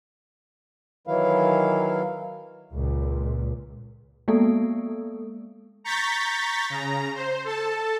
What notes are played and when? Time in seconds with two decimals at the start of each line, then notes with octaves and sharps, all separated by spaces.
1.07 D#3 E3 F#3 E4 F5
2.74 C#2 A#2
4.28 G#3 A#3 B3 A4
5.84 A#5 C#6 G6 A6 B6
6.70 C#3 A#5
7.15 C5
7.45 A4 A5